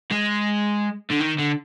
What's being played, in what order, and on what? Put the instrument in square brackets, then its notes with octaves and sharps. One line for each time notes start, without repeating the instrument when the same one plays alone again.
[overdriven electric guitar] G#3
D3
D#3
D3